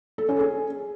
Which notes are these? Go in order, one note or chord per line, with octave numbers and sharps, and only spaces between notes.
A4
C#4
G#4